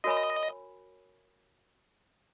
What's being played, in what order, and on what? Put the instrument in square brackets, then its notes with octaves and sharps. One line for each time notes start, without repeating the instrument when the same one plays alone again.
[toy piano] F#4 A#4 C#5 G#5 B5 [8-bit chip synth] D#5